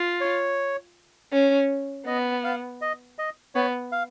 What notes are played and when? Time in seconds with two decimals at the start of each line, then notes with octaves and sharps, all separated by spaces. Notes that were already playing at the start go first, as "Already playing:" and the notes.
Already playing: F4
0.21 C#5
1.32 C#4
2.06 B3 D#5
2.44 F5
2.81 D#5
3.19 D#5
3.55 B3 C#5
3.92 F5